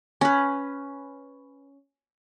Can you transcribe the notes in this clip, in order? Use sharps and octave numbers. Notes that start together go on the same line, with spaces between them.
C#4 B4